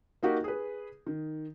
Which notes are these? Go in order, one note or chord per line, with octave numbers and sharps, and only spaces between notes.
A#3 D#4 F#4 G4 A#4
G#4 B4
D#3